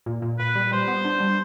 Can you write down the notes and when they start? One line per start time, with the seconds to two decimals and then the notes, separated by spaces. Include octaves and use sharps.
0.06 A#2
0.22 A#2
0.39 A#2 B4
0.55 G3
0.71 G3 C5
0.88 B3
1.05 D4
1.20 G3